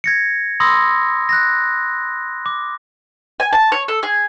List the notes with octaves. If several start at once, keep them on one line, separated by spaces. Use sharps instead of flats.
G#6 A#6 C#7
B5 C6 D#6 E6 A#6
F#6 A#6
D6
G#5
A5
C#5
A4
G#4